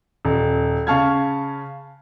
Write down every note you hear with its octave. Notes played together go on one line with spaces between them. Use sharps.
D#1
C#3 F5 A5 C#6 F6 G#6